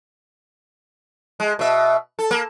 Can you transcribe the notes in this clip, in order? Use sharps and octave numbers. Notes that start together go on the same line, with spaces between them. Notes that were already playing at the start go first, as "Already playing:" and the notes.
G#3
B2 E5
A4
A#3